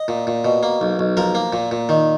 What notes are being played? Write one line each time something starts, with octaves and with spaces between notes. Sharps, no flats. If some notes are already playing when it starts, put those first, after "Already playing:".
Already playing: D#5
A#2
A#2
B2
A#3
B1
B1
F3 A#4
A#3
A#2
A#2
D#3